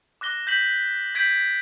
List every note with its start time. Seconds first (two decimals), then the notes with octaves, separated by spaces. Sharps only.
0.21 D6 F#6 A#6 G7
0.47 G6 B6 F#7
1.15 G6 G#6 B6 D7 F#7